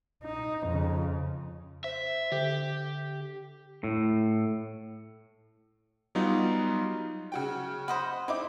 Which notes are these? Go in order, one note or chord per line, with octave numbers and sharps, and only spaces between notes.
D#4
F2 C#3
C5 E5
D3 G4
A2
F#3 G3 B3 D#4 F4
C#3 F#4 G5
C5 D#5 F#5 B5
C4 D#4 E4 D6